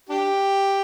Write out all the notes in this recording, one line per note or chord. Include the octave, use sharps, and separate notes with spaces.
D4 G4